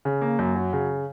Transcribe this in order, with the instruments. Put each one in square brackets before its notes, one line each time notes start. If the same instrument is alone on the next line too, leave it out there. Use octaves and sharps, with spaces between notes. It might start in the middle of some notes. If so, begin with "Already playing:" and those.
[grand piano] C#3
A#3
F#2
F#3
C#3